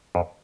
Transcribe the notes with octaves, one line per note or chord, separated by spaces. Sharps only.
F2